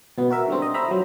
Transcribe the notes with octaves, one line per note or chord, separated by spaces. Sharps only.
B2 B3
F#4 A#4 E5
D3 G3 C4
D#5
C5 E5 A#5 B5
F3 F#3